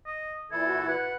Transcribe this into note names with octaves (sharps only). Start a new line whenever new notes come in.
D#5
A#2 E3 E4 A4 G#6
F#4
B4 F#5